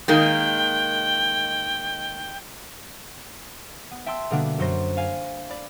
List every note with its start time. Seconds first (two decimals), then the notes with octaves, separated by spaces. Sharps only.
0.08 D#3 G#3 A#3 G5
3.91 B3
4.06 E5 G5 A5 C6 E6
4.30 B2 D3 G3 A#3 B3 D4
4.58 F#2 F#3 C5 C6 A#6
4.97 F5 G#5
5.49 D5 B5